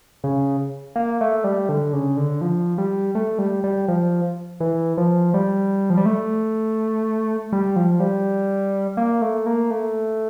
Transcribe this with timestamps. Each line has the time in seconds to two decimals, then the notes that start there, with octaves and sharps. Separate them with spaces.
0.24 C#3
0.96 A#3
1.21 A3
1.44 G3
1.69 D3
1.93 C#3
2.17 D3
2.41 F3
2.78 G3
3.15 A3
3.39 G3
3.64 G3
3.88 F3
4.60 E3
4.97 F3
5.34 G3
5.90 F3
5.97 G3
6.06 A3
7.53 G3
7.76 F3
8.00 G3
8.97 A#3
9.22 A3
9.46 A#3
9.71 A3